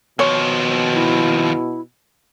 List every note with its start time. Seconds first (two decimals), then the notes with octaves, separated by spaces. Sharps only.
0.19 D#2 B2 F3 C#5
0.94 E4